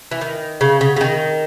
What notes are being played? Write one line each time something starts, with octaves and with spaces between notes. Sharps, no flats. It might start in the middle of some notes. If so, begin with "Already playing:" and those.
E3
D#3
C#3
C#3
C#3
D#3